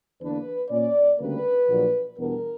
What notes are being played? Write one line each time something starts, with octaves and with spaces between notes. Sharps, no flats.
E2 D3 A#3 D4 B4
A#2 A#3 C#4 D5
D2 C#3 G3 A#3 B4
A#1 A#2 F#3
E2 B2 G3 B3 D4 A#4